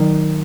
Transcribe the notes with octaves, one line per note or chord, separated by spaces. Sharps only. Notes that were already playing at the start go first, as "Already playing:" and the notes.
Already playing: D#3 F#3